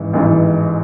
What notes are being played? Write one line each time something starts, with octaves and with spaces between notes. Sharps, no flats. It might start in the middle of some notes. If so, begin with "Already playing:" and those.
Already playing: A1 G#2 E3
A1 G#2 E3